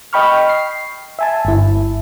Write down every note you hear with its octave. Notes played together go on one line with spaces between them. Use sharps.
D#5 G5 B5 C#6 F6
C7
E5 G#5 A5
G1 E4